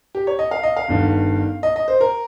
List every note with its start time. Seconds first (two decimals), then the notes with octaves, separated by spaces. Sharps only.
0.15 G4
0.27 C#5
0.39 D#5
0.51 F5
0.63 D#5
0.76 F5
0.88 G1 G2 D#3
1.63 D#5
1.76 D#5
1.88 C5
2.01 A#4